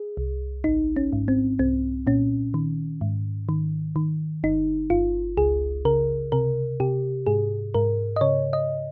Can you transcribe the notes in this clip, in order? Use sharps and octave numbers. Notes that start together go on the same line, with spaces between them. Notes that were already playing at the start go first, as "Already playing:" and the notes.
Already playing: G#4
C2
G#1 D#4
C#4
G#2
C4
C2 C4
A#2 C#4
D#3
G#2
D#3
D#3
G1 D#4
G1 F4
C#2 G#4
C#3 A#4
C3 A#4
C3 G4
G#2 G#4
G#2 A#4
D#5
C#3 C#5
D#5